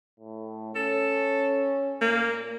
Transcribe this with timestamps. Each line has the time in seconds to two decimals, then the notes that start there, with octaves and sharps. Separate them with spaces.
0.20 A2
0.75 C#4 A4
2.01 A#2 A#3